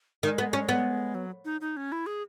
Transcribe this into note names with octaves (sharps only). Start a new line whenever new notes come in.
D#3 G#3
B3
C#4
B3
F#3
D#4
D#4
C#4
E4
G#4